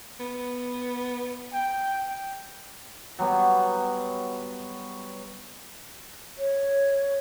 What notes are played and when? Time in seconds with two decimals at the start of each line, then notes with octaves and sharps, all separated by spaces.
0.20 B3
1.53 G5
3.19 F#3 G3 B3
6.38 C#5